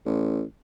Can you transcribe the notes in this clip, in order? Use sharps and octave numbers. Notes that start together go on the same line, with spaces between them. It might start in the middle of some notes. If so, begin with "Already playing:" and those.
A1